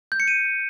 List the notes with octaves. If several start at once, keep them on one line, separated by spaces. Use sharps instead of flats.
G6
C#7
D#7